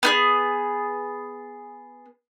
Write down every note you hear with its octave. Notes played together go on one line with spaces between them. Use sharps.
B3 D#4 G#4